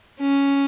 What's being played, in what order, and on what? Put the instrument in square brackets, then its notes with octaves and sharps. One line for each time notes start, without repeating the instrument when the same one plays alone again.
[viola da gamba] C#4